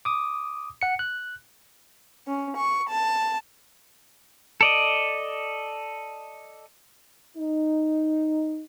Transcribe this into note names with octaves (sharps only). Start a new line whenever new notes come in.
D6 D#6
F#5 C#7
F#6
C#4
C#6
A5
A4 D5 D#5
D#4